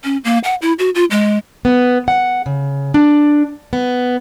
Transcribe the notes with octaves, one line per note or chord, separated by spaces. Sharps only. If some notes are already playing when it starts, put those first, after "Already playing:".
C#4
A#3
F#5
E4
F#4
F4
G#3
B3
F#5
C#3
D4
B3